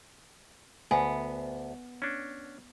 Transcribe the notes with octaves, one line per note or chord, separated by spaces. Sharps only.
D2 B3 G#5
C#4 D4